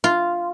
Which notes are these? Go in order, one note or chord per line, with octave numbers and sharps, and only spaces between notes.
F4